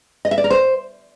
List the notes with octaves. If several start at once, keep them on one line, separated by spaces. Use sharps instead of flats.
D#5
E5
D5
A#4
C5